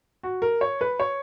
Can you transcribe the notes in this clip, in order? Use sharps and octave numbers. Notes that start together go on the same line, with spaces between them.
F#4
A#4
C#5
B4
C#5